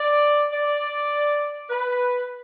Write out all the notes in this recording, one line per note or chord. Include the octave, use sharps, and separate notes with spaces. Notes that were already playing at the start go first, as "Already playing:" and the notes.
Already playing: D5
D5
B4